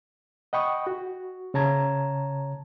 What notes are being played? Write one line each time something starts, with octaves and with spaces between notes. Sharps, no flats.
D#5 F#5 G5 B5 C#6 D#6
F#4
C#3 C#5 A5 A#5 G#6